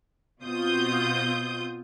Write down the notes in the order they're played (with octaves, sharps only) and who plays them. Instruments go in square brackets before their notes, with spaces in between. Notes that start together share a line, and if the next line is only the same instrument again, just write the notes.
[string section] B2 C4 F4 D#6 G6